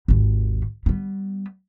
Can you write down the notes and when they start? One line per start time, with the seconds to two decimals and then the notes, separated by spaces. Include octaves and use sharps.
0.08 G#1 D#2
0.86 G3 B3